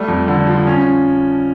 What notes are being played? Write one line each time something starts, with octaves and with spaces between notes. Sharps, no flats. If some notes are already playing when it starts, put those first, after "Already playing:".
Already playing: G3 A3
F2
D3
F3
C#4